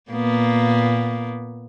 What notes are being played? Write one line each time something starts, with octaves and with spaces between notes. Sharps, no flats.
A#2 A#3 B3